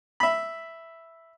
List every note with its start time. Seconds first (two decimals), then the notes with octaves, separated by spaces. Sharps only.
0.20 E5 B5